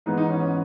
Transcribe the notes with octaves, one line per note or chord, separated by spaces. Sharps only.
G#2 E3 B3 D#4
D#4
C#4
C#4